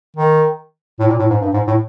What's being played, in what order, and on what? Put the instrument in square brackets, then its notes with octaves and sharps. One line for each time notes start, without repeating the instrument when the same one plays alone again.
[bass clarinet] D#3
A2
A#2
A2
G#2
G2
G#2
A2